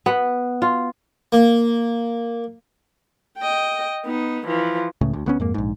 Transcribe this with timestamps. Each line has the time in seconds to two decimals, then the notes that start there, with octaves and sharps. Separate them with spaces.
0.06 B3
0.62 F4
1.32 A#3
3.38 D#5 G5
4.06 B3 D#4
4.47 E3 F3
5.01 C#2 A2 C#3
5.13 D2
5.26 D2 B3 C#4
5.40 F2 G#2 A#3
5.54 A#1 G#2